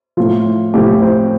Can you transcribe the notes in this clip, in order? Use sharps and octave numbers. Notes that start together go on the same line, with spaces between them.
A2 F3 F4
A2 F3 G4
C4